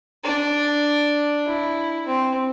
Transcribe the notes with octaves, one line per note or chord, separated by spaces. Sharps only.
D4
E4
C4